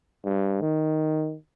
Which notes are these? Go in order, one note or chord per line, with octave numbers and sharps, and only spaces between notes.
G2
D#3